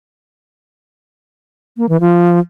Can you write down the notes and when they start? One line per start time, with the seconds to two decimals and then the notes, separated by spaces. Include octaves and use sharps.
1.77 A#3
1.89 E3
2.01 F3